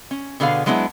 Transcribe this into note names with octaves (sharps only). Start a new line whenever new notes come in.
C#4
B2 D3 B3 G#4 F5
F#3 G#3 B3 D4 E4